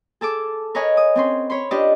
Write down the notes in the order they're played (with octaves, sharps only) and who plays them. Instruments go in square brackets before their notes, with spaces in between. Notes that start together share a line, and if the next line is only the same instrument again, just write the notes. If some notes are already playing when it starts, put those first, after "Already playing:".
[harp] G#4 A4 A5 D6
A#4 B4 C#5 D#5 G#5
D#6
C4 C#4 C6
C#5 B5 C6
D4 F4 G4 B4 D5 D#5